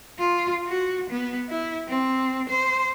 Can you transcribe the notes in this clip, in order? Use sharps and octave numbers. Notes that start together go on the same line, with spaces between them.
F4
F#4
B3
E4
C4
C5